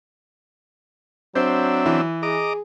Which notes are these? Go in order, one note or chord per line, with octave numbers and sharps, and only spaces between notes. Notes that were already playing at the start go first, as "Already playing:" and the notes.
F#3 C4 D4 C5 E5
E3
G#4 D#5 A#5 D6